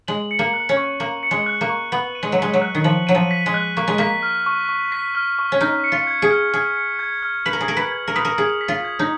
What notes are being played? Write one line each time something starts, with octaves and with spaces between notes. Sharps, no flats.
G#3 F#7
C#7
A#3
F#6
C#4
C#6
A#3 F#7
C#7
G#3
F#6
A#3
C#6
B3 F#7
D#7
G#3
F#3
G#3 B6
F#3
F#6
D#3
F3 F#7
F#3 D#7
F3
B6
G#3
F#6
A#3 C#6
G#3
A#3 B6
F6
C#6
C#6
B6
F6
C#6
C#4
D#4 F6
C#7
F4
G#6
G#4
F6
G#4 F6
C#7
G#6
F6
B4 F#7
A#4
G#4
A#4 B6
B4
G#6
A#4
B4 D#6
A#4
G#4 F#7
B6
F4
G#6
D#4